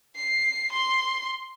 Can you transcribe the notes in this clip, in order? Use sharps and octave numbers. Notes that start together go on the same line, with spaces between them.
C7
C6